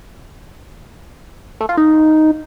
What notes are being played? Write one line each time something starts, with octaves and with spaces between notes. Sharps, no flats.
A3
F4
D#4